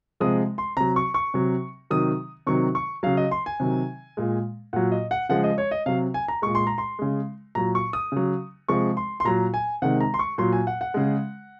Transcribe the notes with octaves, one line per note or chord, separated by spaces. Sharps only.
C3 F3 G#3 D#6
C6
C3 F#3 A#5
C#6
C#6
C3 F#3
C3 D#3 F#3 D#6
C3 D#3 F#3 C#6
C#6
C#3 F#3 F5
D#5
C6
G#5
C3 D#3 F#3
A#2 G#3
A#2 F#3 F#5
D#5
F#5
C#3 F3 G#3 F#5
D#5
C#5
D#5
C3 F#3 F5
G#5
A#5
A#2 G#3 C#6
C6
A#5
C6
C#3 G#3
A#2 F#3 A#5
C#6
D#6
C#3 F#3
C3 F3 G#3 C#6
C6
C6
A#2 F#3 A#5
G#5
C3 D#3 G#3 F#5
A#5
C6
C#6
A#2 F#3 C6
G#5
F#5
F#5
C#3 G#3